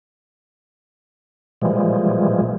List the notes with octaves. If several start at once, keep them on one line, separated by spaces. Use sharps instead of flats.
A#2 E3 F3 G3 G#3